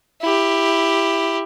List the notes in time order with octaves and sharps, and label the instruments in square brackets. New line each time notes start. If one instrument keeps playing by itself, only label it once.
[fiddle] E4 G4